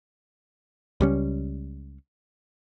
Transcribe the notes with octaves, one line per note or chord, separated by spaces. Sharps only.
C#2 G3 C#4